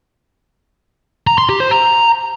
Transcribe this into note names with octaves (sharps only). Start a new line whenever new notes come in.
A#5
C6
G4
C5
A#5